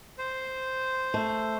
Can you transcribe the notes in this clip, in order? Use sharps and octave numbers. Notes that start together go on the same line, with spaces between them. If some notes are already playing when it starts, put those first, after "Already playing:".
C5
A3